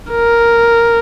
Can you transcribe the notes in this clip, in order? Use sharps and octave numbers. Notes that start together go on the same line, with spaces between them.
A#4